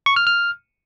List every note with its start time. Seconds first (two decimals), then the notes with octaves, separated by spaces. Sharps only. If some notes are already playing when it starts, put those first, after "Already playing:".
0.06 C#6
0.16 F6
0.27 F6